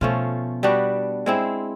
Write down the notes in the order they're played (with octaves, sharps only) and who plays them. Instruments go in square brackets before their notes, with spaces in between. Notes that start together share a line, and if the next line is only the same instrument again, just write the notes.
[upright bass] B2 [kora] F3 A3 C#4 F4
[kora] G3 B3 D4 F#4
G#3 C4 E4